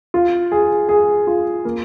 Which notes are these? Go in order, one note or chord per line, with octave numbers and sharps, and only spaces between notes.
F4
G#4
G#4
F4
A#3